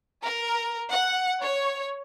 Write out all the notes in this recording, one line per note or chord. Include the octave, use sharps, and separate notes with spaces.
A#4
F#5
C#5